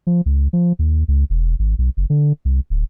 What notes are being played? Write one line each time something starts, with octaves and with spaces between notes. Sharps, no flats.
F3
C#2
F3
D#2
C#2
E1
G#1
B1
F#1
D3
C2
D1